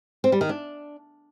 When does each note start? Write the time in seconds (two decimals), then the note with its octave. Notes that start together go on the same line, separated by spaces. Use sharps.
0.24 C4
0.32 G3
0.41 D#3
0.49 D4